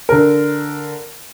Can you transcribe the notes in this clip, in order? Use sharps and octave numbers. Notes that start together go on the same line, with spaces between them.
D3 A#4